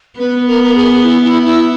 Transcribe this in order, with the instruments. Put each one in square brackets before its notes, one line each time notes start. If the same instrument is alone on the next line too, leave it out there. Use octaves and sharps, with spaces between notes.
[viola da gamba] B3 [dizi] B4
[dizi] A#4
A#4
G#4
E4
E4
E4